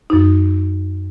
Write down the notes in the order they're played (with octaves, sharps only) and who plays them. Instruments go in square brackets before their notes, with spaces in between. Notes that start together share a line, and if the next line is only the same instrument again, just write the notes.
[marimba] F#2 D#4